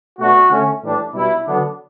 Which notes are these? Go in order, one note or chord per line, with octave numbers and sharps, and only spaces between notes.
B2 A3 D4 F#4
D3 A3 C#4
A2 E3 G3 D4
B2 G3 D4 E4
D3 F#3 B3 D4